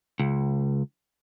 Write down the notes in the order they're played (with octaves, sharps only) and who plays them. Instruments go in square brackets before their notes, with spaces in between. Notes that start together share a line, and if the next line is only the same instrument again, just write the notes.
[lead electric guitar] C#2